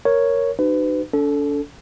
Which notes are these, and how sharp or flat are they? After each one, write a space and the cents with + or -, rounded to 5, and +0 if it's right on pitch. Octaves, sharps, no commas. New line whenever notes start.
A#4 +0 C#5 +0
D#4 -35 F#4 +40 B4 +35
D4 -45 A4 +0